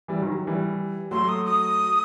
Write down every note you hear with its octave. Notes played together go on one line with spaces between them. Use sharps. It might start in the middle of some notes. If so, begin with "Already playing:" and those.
E3 G3
D#3 F#3
E3 G3
F#3 A3 C6
D#6
D#6